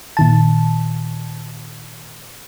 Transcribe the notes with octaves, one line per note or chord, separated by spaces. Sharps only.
A#2 D#3 A5